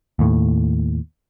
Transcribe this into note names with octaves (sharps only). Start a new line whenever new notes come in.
D#2 A2